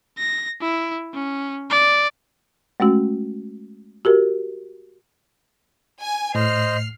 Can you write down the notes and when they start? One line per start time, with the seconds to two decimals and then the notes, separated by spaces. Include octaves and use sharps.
0.19 A#6
0.62 E4
1.14 C#4
1.70 D5
2.80 G#3 A3 C#4 F#4
4.05 F#4 G4 A#4
6.00 G#5
6.35 A2 C5 D#5 F6 C7